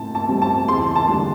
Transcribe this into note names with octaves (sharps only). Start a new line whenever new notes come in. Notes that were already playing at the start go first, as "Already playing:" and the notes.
Already playing: A2 C4 A5
A5
G3 C4
A5
E2 C6
A5
D3 G3 D4